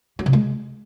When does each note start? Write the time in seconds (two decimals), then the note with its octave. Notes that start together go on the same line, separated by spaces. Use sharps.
0.19 F#3
0.26 C3
0.33 G#3